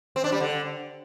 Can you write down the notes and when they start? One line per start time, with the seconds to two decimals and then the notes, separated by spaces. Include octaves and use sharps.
0.16 C4
0.24 D4
0.32 G3
0.40 D3